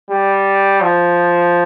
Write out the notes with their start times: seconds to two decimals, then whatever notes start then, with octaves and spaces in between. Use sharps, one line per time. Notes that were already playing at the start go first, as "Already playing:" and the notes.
0.10 G3
0.81 F3